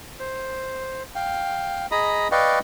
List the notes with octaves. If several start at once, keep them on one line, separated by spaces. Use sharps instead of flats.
C5
F5 G5
G#4 D#5 A#5 B5 D#6
B4 D5 D#5 F5 G5 C#6